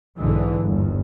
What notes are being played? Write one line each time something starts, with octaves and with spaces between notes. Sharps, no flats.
B1 G#2 D3 E3
G1 D#2